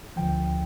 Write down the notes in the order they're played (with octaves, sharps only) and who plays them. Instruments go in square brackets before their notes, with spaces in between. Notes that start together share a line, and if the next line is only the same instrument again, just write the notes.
[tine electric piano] D2 D3 F3 G5